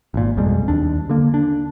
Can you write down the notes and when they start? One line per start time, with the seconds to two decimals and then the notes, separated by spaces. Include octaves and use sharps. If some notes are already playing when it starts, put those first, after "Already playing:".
0.14 G#1 A#2
0.37 B1 F2 G3 G#3
0.68 D#2 D4
1.09 D3 A#3
1.34 D4